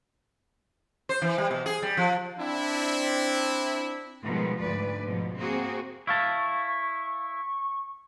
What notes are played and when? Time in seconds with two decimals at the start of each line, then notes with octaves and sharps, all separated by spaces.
1.09 C5
1.22 E3
1.38 G3
1.51 B2
1.66 G#4
1.82 G3
1.97 F3
2.38 C4 D4 E4
4.23 B2 D#3 F3 G3 G#3
4.60 D2 G#2 B4 D5
5.05 G#2 B2 F3
5.37 A#3 C4 F#4 G#4
6.07 E4 F5 A5 C#6